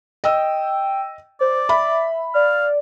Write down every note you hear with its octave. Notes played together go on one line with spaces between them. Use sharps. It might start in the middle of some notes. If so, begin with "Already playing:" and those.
D#5 G5 E6
C5 D5
E5 B5
D5 F5